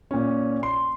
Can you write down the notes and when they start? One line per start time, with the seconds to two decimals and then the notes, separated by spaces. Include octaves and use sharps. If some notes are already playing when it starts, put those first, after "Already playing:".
0.11 A#2 C#4
0.63 C6